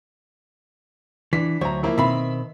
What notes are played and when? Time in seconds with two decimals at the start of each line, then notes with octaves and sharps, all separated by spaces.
1.33 E3 D4 B6
1.61 D2 F#3 C5 C#5 A#5
1.83 F3 A#3 E4
1.98 B2 D#3 C4 E5 B5